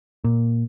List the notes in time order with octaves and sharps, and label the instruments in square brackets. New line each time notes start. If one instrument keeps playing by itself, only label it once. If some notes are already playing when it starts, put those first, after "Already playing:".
[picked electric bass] A#2